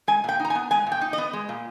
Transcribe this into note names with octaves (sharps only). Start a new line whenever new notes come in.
G#3 G#5
A#2 G5
D#4 A#5
G#5
B3
G#3 G#5
A#2
G5
D#4
D#5
B3
G#3
A#2